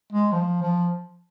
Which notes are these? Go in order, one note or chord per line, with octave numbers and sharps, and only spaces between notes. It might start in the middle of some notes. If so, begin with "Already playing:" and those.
G#3
F3
F3